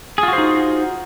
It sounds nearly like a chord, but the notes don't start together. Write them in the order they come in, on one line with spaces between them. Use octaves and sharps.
G#4 F4 F#4 C5 D#4